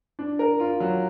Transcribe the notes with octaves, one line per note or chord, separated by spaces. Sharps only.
D4
A#4
F4
F#3